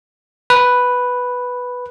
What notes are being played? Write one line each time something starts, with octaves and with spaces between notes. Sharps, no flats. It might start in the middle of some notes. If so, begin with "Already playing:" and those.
B4